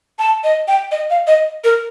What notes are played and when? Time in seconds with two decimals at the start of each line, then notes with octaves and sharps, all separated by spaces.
0.19 A5
0.44 D#5
0.68 G5
0.91 D#5
1.10 F5
1.27 D#5
1.64 A#4